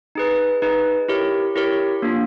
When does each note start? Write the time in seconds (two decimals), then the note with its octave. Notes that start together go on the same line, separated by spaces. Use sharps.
0.15 D#4 G#4 B4
0.62 D#4 G#4 B4
1.09 E4 G4 A#4 C#5
1.56 E4 G4 A#4 C#5
2.02 A#3 D4 F4